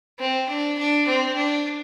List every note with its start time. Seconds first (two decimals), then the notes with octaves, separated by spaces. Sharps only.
0.19 C4
0.48 D4
0.78 D4
1.07 C4
1.37 D4